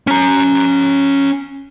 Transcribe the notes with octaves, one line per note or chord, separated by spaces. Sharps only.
C#4 A#5